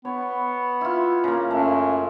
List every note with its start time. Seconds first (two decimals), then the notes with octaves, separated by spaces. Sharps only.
0.05 B3 C#5
0.81 E4 F4
1.24 C#3 A#3
1.51 F#2 A3